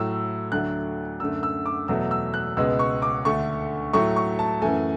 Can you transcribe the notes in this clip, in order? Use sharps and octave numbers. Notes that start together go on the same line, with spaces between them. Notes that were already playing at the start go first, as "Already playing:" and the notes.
Already playing: A2 F#3 A3 E6
D2 D3 F#3 A3 F#6
F#2 D3 A3 E6
E6
D6
E2 B2 F#3 A3 E6
E6
F#6
C#2 B2 G#3 B3 E6
C#6
D6
D2 D3 A3 C#6
A2 F#3 A3 C#6
C#6
A5
F#2 E3 A3 G#5